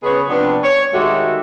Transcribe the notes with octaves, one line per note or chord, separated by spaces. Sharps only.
C#3 B3 G#4 B4 C#5
C3 F3 B3 D4
C#5
D#3 G#3 A3 F#4 G4